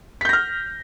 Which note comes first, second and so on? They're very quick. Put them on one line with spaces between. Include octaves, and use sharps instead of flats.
B6 G6 A#6 F6